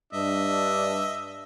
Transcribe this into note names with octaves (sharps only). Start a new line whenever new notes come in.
G2 D4 D#5 E5